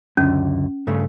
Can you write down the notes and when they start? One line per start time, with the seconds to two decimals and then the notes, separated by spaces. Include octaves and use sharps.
0.17 C#2 F#2 D3 C#4
0.87 G2 C#3 A3